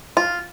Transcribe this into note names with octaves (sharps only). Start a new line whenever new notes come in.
F4